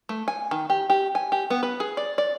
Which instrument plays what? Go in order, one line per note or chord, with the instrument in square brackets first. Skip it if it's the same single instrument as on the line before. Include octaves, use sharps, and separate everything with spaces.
[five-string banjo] A3
G#5
D#3
G4
G4
G#5
G4
B3
B4
G#4
D5
D5